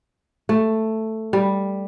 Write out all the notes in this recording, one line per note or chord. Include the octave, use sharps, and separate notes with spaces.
A3
G3